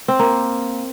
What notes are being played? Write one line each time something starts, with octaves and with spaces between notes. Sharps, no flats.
C4
A#3